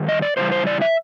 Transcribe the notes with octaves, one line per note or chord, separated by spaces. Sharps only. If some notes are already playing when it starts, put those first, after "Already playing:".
Already playing: G2 D#3
D#5
D5
C#3 E3 G3 C5
C5
D5
E5